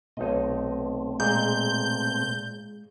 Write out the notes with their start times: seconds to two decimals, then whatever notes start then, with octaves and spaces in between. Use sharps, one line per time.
0.17 B1 B2 A3 C4 D#4 D#5
1.20 A#2 G#3 G6